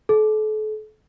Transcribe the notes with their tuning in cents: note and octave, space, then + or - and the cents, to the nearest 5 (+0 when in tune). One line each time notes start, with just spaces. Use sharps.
A4 -40